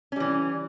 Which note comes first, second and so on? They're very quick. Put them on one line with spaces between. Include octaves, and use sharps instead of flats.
C#4 G3 E3